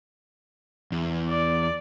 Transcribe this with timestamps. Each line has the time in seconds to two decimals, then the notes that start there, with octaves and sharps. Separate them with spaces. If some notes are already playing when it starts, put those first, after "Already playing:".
0.92 E2
1.29 D5